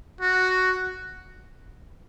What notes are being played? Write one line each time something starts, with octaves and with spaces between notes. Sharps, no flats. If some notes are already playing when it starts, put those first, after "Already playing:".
F#4